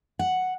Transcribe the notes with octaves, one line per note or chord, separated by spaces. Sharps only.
F#5